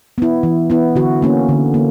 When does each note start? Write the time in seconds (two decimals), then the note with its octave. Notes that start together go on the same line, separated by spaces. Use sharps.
0.18 B3 E4
0.43 E3
0.70 B3 E4
0.96 D3 F#4
1.22 A#3 C#4
1.49 D3
1.74 A#3